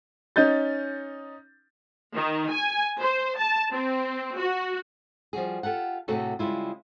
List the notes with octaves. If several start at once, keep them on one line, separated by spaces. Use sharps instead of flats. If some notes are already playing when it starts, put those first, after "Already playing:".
C#4 D#4 G6 A6
D#3
G#5
C5
A5
C4
F#4
F3 G3 F#4 G#4
F4 G4 A4 F#5
A2 C3 A3 F#4 G#4 A4
C#3 G3 G#3 E4 F4